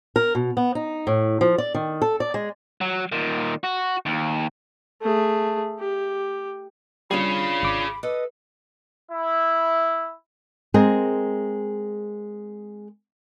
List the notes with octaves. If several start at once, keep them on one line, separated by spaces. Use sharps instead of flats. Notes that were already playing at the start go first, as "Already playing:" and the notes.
A#4
B2
B3
D#4
A2
F3
D5
D#3
A4
D5
G#3
F#3
A#2 D#3
F#4
D#2
A3 G#4
G4
G3 C#4 D4 F4 G#4 F5 B5
G#1 D6
A4 B4 D#5
E4
G#3 C4 G#4 A#4